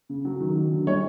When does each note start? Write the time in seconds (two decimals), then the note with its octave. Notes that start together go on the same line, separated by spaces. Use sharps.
0.09 C#3
0.25 F#3
0.40 D#3
0.56 F#3
0.72 D3
0.87 G3 C#5